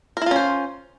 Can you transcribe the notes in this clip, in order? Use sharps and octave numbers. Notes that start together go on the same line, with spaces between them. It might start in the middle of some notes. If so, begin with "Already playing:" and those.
C#4 E4 F4 A#4 C5